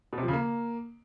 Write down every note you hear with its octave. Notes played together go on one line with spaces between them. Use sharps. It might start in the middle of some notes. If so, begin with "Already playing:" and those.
B2
C3
F3
C#3
A#3